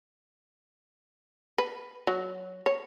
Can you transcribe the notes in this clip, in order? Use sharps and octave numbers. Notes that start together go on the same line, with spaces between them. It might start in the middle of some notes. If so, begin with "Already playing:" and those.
B4
F#3
C#5